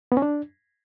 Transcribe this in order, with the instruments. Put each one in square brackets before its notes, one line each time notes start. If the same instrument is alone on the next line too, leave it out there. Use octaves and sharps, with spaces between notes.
[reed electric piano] B3
C#4
D4